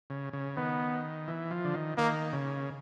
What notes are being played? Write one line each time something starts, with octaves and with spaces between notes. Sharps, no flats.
C#3
C#3
D#3 B3
E3
F3
D3
D#3
D#3 A#3
C#3